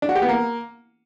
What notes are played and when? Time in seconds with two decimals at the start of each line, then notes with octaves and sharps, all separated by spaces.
0.02 D4
0.09 F#4
0.15 G4
0.22 B3
0.29 A#3